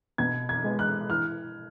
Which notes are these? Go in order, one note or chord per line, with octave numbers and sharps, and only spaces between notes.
B2 G#6
G#6
G#3 B3
F#6
E3 F6